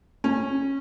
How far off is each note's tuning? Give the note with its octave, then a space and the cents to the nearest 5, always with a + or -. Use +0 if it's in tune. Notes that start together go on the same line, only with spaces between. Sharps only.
C#4 -15